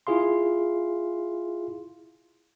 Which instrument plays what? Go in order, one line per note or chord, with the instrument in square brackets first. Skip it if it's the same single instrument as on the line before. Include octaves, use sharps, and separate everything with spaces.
[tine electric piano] E4 F4 G#4 F5 C6